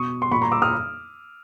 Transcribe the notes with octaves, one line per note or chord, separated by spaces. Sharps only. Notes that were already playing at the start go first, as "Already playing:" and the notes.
Already playing: B2 C#6 D#6
C6
A#2 B5 C#6
A#5 C6
D6 E6
D#6 F6